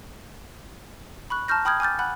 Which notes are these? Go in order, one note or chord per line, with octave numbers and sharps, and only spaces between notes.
B5 C#6 F#6
A5 A#5 C#6 F6 G6 A#6
G5 B5 D#6 F6 G6 G#6
G#5 D6 F6 G6 A6
F#5 G#5 B5 F#6